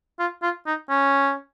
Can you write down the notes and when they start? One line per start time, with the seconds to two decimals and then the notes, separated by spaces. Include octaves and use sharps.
0.19 F4
0.42 F4
0.67 D#4
0.89 C#4